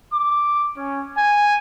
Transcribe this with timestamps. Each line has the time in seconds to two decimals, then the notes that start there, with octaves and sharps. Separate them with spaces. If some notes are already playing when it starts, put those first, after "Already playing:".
0.13 D6
0.77 C#4
1.16 G#5